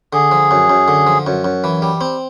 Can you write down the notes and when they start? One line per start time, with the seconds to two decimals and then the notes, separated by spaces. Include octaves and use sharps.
0.13 D3 G#4
0.31 F3
0.51 F#2
0.69 F#2
0.88 D3
1.07 F3
1.27 F#2
1.44 F#2
1.64 E3
1.82 G3
2.01 C4